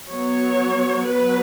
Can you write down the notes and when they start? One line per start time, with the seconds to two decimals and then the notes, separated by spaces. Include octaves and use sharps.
0.10 F#3 B3 C#5
1.09 F#3 B3 B4